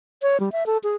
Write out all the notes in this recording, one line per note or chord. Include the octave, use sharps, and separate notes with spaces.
C#5
G3
E5
A4
G#4